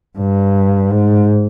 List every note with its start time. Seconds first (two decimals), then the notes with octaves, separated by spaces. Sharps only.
0.18 G2
0.91 G#2